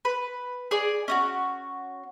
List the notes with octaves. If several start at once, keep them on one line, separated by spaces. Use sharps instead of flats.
B4
G#4 D5
C#4 D#4 F#4